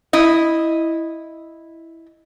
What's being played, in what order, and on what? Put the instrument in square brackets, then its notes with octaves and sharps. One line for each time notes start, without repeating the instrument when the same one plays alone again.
[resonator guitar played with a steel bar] E4 D#5